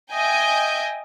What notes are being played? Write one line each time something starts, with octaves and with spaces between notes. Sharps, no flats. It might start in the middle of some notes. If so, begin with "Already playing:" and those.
D#5 E5 G5 G#5 G6